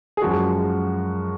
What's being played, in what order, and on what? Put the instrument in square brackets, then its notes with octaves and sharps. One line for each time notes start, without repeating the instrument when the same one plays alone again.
[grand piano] G#4
F#2 F3 G#3 F#4